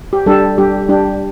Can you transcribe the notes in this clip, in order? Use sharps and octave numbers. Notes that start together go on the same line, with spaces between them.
G4
G3 D4 G4 A4
G3 D4 G4
G3 D4 G4